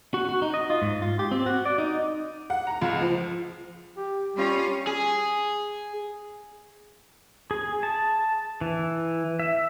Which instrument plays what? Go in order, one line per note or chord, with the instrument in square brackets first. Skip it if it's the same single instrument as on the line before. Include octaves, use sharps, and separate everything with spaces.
[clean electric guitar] F#4
F#4
D#4
D#5
F4
G#2
F4
G4
C4
F#4
D5
D#4
[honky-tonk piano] F#5
A#5
C#2
F3
[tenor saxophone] G4
[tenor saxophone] G3 [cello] C#4 F4
[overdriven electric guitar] G#4
[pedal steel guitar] G#4
A5
E3
E5